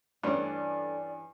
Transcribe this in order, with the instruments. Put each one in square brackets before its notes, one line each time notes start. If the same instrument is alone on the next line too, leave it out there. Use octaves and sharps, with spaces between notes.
[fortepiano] G2 [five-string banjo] E3 C#4 [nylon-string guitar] A3 D4 [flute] D5